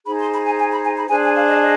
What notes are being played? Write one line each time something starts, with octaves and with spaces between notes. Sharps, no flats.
D#4 G#4 C5 B5
C6
B5
G#5
G#5
B5
G#5
B5
D4 G#4 C5 G#5
G#5
F5
D#5
D#5